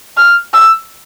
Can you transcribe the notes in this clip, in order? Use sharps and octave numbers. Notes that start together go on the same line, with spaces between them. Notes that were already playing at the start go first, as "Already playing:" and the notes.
F6
E6